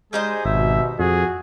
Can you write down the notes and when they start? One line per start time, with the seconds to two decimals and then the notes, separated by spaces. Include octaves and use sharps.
0.13 G3 G#3 D#4 G#4 C5
0.45 G#1 B2 E5
0.99 F2 F#4 G#4